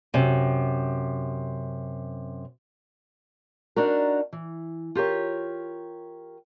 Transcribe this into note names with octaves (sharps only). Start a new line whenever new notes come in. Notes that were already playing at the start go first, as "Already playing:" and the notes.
F#2 C3
D4 D#4 F#4 A#4
E3
F4 G4 A#4 C#5